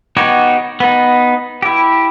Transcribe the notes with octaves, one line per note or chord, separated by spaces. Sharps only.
B3 D#4 F#4 G4 C#5
B3 D#4
E4 G4